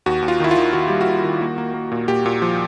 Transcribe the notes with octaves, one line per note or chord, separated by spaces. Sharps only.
D#2 F#4
D#2
F4
D#3 E4
F4
D#3
D#3 F#4
G3 G4
F#4
D#3
D#3
A#3
A#3
A#3
A#2
A#2 G4
A#2
F3